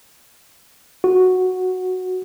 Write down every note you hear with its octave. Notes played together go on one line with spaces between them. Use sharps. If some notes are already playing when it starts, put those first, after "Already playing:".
F#4